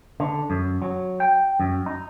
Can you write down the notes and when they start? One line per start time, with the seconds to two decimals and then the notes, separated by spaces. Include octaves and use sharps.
0.20 D3
0.50 F#2
0.82 F#3
1.20 G5
1.60 F#2
1.86 D#4